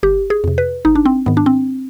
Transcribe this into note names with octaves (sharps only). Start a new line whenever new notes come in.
G1 G4
G#4
F2 C3
B4
G#1 D#4
D4
C4
G#2 D#3 B3
D4
C4